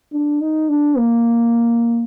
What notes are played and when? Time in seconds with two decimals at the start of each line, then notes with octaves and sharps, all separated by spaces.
0.13 D4
0.41 D#4
0.69 D4
0.97 A#3